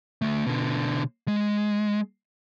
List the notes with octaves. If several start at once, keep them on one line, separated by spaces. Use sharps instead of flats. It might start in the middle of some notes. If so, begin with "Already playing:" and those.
D2 A3
B2 D3
G#3